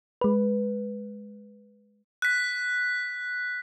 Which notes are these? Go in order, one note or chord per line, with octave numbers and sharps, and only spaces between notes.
G#3 B4
F#6 B6